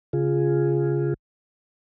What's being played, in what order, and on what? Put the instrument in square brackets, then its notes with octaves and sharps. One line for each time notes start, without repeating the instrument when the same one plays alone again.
[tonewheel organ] C#3 F4 G#4